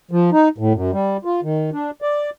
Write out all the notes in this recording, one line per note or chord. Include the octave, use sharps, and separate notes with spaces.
F3
D#4
A2
F#2
G3
F4
D#3
D4
D5